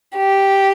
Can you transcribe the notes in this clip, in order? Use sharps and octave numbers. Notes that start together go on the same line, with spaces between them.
G4